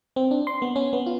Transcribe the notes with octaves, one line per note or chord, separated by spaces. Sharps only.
C4
D4
C6
B3
C#4
B3
F4